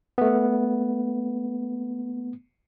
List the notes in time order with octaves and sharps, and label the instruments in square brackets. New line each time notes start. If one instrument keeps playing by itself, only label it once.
[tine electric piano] A3 B3